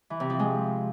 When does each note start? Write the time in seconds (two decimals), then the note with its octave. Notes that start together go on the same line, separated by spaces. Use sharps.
0.10 E3
0.20 C3
0.30 F3
0.39 G#3